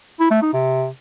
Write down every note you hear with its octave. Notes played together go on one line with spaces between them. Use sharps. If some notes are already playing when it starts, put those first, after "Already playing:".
E4
A3
D#4
C3